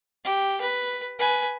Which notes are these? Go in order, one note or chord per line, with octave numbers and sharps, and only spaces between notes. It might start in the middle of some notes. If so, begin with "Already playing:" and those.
G4
B4
B4 G#5